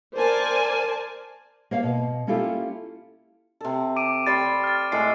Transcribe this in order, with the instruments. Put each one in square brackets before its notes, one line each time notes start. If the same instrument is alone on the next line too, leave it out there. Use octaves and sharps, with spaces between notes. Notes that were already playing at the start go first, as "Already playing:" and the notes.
[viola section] A#4 C5 D5 G#5 A5
[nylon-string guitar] A#3 C#5 F5
B2
A#3 C#4 E4 F4 G4 A4
[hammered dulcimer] C3 A4
[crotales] D6 D7 D#7
[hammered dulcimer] G3 C6 C#6 [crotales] A6
[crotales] F6 A6
[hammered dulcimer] A2 G#3 C#6 [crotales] C7